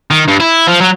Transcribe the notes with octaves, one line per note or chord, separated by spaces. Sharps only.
D#3
G2
E4
F3
F#3